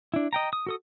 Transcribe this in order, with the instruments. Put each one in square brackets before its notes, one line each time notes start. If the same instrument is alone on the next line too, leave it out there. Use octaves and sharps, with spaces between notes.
[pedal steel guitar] D4 E4
D#5 G5 A#5
D#6
F#4 A4 D#6